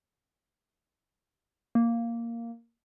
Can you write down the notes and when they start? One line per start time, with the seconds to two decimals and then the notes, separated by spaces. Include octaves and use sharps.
1.75 A#3